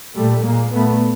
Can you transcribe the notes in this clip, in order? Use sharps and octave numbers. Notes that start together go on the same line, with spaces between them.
A#2 G3 A3
A#2 G#3 A#3
A#2 A3 B3